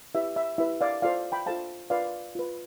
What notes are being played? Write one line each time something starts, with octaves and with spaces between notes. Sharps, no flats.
E4 G4 B4 E5
E5
E4 G4 B4 E5
D5 F5
F4 A4 C5 D5 F5
G5 B5
F4 A4 C5 F5 A5
F4 B4 D5 F5
F4 B4